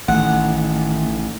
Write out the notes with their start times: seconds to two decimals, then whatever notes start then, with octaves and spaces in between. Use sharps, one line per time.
0.08 A1 D#3 A3 F#5